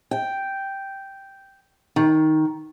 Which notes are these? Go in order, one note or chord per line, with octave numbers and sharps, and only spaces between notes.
G5
D#3